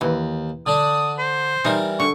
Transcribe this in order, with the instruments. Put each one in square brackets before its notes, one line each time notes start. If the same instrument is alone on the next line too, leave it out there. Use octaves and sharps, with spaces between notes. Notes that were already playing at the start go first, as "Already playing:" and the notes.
[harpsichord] D#2 [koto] E3
[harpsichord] D3 D4 [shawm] D#6
[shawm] C5
[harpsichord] E3 G3 A#4 [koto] D#4
[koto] D3 [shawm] C#6